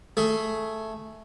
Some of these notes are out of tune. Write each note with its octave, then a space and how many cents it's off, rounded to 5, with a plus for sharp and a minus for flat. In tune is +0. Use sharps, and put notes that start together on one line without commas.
A3 +0 G#4 +15